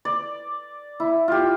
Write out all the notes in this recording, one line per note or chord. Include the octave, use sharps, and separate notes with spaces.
D5
E4
F4 G4